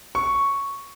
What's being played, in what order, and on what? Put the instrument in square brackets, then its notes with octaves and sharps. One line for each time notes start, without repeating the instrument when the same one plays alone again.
[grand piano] C#6